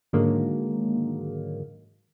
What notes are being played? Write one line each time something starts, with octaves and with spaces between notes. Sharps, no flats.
G#2 D3 D#3 F#3 G#3 A#3